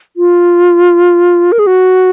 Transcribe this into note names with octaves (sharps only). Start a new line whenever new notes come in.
F4
A#4
G#4
F#4